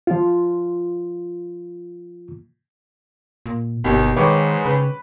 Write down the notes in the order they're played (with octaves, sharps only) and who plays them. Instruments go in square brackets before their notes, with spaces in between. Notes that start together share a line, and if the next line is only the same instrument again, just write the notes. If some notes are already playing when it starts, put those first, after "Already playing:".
[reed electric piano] F3 F4
[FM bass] A#2
[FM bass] G1 [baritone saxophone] D#2 [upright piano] B2 D#4 G4
[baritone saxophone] G#2 [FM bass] D#3 [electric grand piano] G#3 B4 [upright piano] C#5 G5 D6
[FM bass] C#3 [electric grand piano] B4